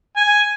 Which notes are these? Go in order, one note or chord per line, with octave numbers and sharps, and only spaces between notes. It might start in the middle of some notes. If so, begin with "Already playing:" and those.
G#5